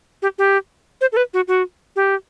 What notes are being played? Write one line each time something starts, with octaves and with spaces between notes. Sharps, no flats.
G4
G4
C5
A4
B4
F#4
F#4
G4